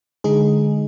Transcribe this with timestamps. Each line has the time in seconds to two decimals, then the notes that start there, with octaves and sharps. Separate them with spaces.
0.24 D3 G#3 D#4 G#4